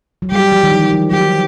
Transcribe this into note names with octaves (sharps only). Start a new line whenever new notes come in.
F#3
G3 G4
F3
D#3
E3
F3
F#3 G4